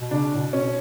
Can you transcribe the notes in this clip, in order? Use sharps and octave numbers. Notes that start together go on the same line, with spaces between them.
B2
C#3 D4
A2
B2
C#4